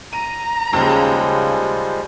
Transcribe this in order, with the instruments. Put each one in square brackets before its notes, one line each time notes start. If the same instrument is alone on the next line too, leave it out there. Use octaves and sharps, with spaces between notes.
[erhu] A#5 [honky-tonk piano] D#7
[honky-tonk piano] D#2 [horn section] C#3 [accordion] F3 G3 G#3